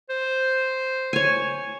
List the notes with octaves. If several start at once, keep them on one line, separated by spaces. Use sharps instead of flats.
C5
C#5 G#5